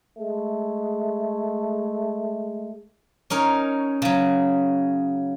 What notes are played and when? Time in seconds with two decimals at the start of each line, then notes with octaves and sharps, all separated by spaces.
0.19 G#3 A3
3.30 C#4 D#4 A#4 C#5
4.02 C#3 F#3